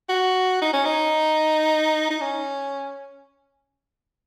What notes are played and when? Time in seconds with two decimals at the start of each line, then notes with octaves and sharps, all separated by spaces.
0.09 F#4
0.62 D#4
0.73 C#4
0.85 D#4
2.10 D#4
2.21 C#4